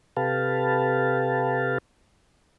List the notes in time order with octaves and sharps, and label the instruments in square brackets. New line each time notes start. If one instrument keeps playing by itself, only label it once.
[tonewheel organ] C3 G4 A4 B4 F5 A5